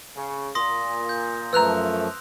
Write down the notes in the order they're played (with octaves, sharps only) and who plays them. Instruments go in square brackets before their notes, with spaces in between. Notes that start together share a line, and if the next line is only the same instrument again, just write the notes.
[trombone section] C#3
[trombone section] A#2 [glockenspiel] C6 D#6 A#6
[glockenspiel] G6
[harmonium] F#2 F3 A3 [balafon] B4 A#5 [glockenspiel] E6 F#6 F7